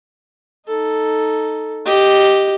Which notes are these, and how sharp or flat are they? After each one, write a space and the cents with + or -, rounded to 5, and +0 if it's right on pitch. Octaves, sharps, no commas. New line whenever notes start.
D#4 +0 A4 +0
G4 +0 D#5 +0